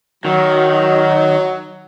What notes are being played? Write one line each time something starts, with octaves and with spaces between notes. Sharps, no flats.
D#3 F#3